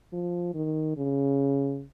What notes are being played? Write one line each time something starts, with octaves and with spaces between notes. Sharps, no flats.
F3
D#3
C#3